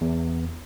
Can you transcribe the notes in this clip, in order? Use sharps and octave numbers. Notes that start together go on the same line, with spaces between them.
E2